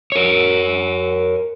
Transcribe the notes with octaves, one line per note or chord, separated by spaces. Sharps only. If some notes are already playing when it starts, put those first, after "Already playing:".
A#4 C#5